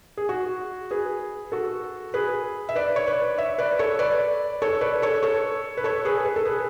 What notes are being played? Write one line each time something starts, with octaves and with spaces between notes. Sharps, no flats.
G#4
F#4
G#4 B4
F#4 A4
G#4 B4
E5
B4 D5
C#5
B4 D5
C#5 E5
B4 D5
A4 C#5
B4 D5
A4 C#5
B4 D5
A4 C#5
A4 C#5
B4
A4 C#5
G#4 B4
B4
A4
G#4 B4